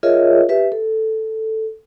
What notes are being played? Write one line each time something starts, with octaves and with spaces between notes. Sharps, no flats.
F4 G#4 A#4 C#5 D#5 E5
G4 B4 E5
A4